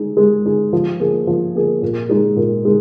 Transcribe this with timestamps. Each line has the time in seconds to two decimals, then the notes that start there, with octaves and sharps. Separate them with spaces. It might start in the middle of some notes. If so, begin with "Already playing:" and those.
Already playing: G#3 D#4 G#4
0.17 G#3
0.45 D#4 G#4
0.73 F3
1.00 A#3 G#4
1.27 F3
1.55 A#3 G#4
1.82 A#2
2.09 G#3 D#4 G#4
2.36 A#2
2.65 G#3 D#4